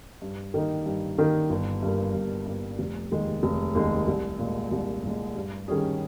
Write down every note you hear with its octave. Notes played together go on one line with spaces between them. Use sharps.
G2
D#3 G3 A#3 D#4
G2
D#3 G3 A#3 D#4
G1
G2 G3 A#3
G1
G2 G3 A#3
F1
D#2 D#3 G#3
F1
D#2 D#3 G#3
C2
A#2 G#3
C2
A#2 G#3
G2
D#3 G3 C#4 G#4